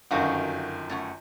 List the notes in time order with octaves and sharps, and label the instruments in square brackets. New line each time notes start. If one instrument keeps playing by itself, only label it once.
[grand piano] G1 F#2 D#3 [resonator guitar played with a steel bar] F#4 F5 F#5
[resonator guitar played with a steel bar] A3 C#4 F#5